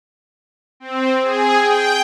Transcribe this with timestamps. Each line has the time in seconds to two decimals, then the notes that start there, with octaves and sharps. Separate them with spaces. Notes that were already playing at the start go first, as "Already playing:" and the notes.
0.80 C4
1.22 G#4
1.62 G5